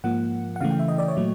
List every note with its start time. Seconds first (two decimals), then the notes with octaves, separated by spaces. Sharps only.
0.04 G#2 F3 A#3 F#5
0.56 F#5
0.61 C#3 E3 A3 F5
0.70 G5
0.79 E5
0.88 D#5
0.98 D5
1.08 C#5
1.17 A#2 F#3 A3